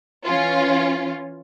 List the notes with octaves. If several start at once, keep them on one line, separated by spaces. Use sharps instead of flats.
E3 C#4 F4